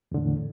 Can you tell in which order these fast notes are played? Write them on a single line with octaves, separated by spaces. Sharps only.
E2 D3 A2